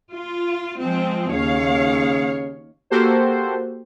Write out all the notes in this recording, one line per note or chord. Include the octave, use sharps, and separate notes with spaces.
F4
F3 G#3 C4
D#2 C#3 C#5 F5
A#3 F#4 G4 A4 C5